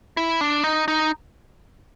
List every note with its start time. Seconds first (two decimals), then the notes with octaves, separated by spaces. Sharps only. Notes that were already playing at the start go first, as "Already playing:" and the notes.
0.17 E4
0.41 D4
0.64 D#4
0.88 D#4